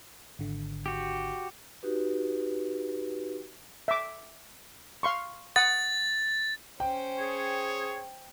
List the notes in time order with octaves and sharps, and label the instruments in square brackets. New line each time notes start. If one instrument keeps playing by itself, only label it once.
[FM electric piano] G#1 D3
[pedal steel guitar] F#4 G4
[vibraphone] D#4 F#4 G4 B4
[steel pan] E5 D6
F5 C6 C#6
[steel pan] F#5 D#6 [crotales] A6
[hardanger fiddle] C#4 C5 [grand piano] G5
[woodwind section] G#4 [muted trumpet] C#5